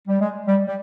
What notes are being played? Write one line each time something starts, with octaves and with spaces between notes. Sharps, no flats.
G3
G#3
G3
G3